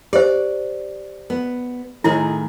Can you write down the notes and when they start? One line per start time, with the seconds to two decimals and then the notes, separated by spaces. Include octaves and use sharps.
0.13 G4 C5 D5
1.30 B3
2.04 A2 D#3 E4 G#4